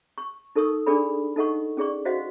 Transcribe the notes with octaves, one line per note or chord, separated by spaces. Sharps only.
C#6
D#4 A4 A#4 C#6 D#6
D4 G#4 A4 D5 B5
D#4 A4 D#5 F#5 C#6
C#4 G#4 D5 C#6
F#4 C5 D#5 F5 F#5